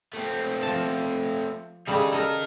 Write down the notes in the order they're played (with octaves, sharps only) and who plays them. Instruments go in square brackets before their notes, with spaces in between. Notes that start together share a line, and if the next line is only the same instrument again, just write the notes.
[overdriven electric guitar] A3 C4
[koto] F3 A5
[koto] C#3 G3 A4 [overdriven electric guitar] D#4 G#4
[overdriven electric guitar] D#4 A#4 [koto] A4 D#5 A#5